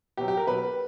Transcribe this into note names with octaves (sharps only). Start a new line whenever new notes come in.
B2 F#3 G4
G4
A#4
B2 F#3 B4